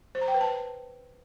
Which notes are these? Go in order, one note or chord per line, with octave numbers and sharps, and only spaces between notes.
C5
A#5
G5
B4
A5